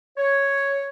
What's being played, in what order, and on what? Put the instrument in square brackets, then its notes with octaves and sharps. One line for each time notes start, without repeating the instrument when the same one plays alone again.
[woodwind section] C#5